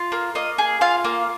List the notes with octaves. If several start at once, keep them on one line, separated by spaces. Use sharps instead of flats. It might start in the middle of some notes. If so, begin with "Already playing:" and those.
Already playing: F4
A#3
A#3 D#5
G#4
F4 F5
A#3